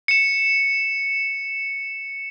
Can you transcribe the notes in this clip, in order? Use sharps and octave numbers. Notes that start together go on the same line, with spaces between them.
C#7 E7